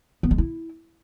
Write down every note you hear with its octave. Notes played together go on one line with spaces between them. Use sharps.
B3
G#3
E4